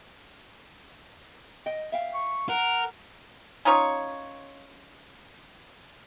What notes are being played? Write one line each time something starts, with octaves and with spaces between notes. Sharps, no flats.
D#5 G5
E5 F5 G5
C#6
A#4 F#5
C#4 D#4 F4 C#5